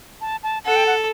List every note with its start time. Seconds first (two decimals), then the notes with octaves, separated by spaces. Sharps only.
0.21 A5
0.43 A5
0.65 A4 F#5
0.76 G5
0.86 F#5